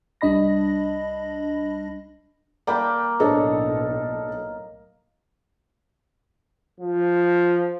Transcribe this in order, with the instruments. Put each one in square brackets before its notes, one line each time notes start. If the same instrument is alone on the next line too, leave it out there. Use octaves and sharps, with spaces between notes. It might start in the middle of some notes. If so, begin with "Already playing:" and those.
[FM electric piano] C2 G3 D4 D#5 B5 A#6
[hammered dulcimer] A#3 [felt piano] D5 G5 B5
[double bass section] B1 A2 [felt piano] D4 A4 C#5 [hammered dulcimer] D#5
[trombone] F3